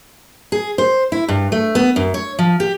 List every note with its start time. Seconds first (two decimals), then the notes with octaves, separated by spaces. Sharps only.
0.52 G#4
0.78 C5
1.12 E4
1.28 G2
1.52 A3
1.75 B3
1.96 F#2
2.14 C#5
2.39 F3
2.60 G4